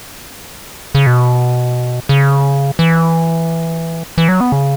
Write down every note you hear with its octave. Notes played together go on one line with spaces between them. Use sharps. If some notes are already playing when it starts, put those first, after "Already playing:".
C#3
B2
C#3
E3
E3
F#3
B3
C#3